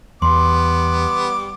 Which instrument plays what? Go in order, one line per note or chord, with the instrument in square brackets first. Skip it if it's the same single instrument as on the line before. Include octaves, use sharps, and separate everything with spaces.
[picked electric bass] E2 [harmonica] G3 B3 D6 [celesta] C6